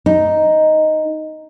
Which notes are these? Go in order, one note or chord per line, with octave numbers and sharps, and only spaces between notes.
D#4